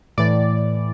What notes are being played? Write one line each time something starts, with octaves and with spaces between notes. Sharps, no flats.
A2 E3 D5